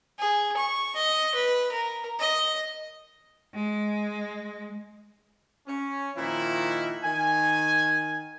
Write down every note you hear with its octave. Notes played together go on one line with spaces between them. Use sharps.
G#4
C#6
D#5
B4
A#4
D#5
G#3
C#4
A#2 D#3 F3 E4
D#3 G#5